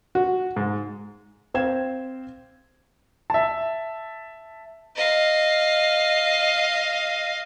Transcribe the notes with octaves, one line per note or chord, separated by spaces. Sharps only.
F#4
G#2
C4 C5 F5 G5 G#6 E7
E5 A5
D#5 F5